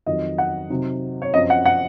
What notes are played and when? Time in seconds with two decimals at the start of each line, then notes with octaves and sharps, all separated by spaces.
0.06 F2 D#3 F#3 D#5
0.38 F#5
0.70 C3 F#3 C4 D#4
1.22 C#5
1.34 F#2 F3 C4 D#5
1.50 F#5
1.66 F#5